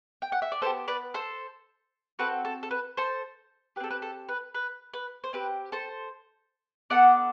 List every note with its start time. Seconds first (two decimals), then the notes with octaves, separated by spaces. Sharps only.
0.22 G5
0.32 F#5
0.42 E5
0.52 D5
0.62 B3 E4 G4 A4 C5
0.88 B4 D5
1.14 A4 C5
2.19 C4 F#4 A4 B4
2.45 A4
2.63 A4
2.71 B4
2.97 A4 C5
3.76 G4 B4
3.80 C4 A4
3.91 B4
4.02 A4
4.29 B4
4.55 B4
4.93 B4
5.24 C5
5.33 C4 G4 B4
5.72 A4 C5
6.90 B3 D4 A4 D5 F#5